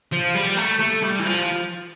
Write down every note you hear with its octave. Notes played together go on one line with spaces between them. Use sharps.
F3
G3
A3
A3
G3
E3
F3